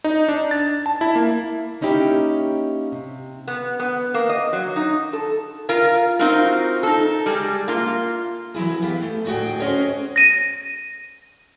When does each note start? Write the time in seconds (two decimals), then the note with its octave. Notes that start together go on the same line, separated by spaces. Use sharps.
0.04 D#4
0.28 D4
0.51 A6
0.86 A5
1.01 E4
1.15 A#3
1.81 A#3 C#4 D#4 E4 G4
2.92 C3
3.48 B3
3.80 B3
4.14 A#3
4.29 D#5
4.53 F#3
4.76 D#4
5.13 A4
5.69 F4 A#4 F5
6.19 C4 D#4 F4 F#4 A#4
6.83 D#4 A4
7.26 G3 G#3
7.68 A#3 F4
8.54 E3 F#3 E4 G#4
8.82 B3 G4 F5
9.02 A3
9.25 D2 A2 F#4 G#4 F#5 G5
9.60 C#4 F#4 G#4 C5 C#5 D#5
10.16 A#6 D#7